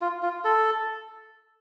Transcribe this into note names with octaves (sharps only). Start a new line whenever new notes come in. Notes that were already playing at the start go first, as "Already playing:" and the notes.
F4
F4
A4